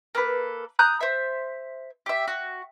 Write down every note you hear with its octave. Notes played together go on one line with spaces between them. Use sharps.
A#3 A4 B4
A#5 D#6 F#6 G6
C5 E5
G4 E5
F#4